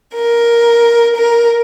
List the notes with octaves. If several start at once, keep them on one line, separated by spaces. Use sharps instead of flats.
A#4
A#4